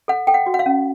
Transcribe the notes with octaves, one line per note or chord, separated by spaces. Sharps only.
A4 F#5
A4 G5
F#5
F#4
F#5
F5
C#4